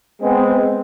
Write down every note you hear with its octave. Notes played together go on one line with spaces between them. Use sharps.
G#3 B3 C4